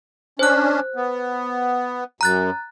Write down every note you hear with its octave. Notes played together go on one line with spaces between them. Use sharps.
C#4 D4 C5 F#6
B3
F#2 A#5 F#6 A6